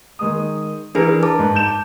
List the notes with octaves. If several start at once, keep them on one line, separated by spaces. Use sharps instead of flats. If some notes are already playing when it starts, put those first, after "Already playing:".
D#3 G#3 D#6
E3 D4 G#4 A#4 B4
A#4 A5 D6
G#2
G6 E7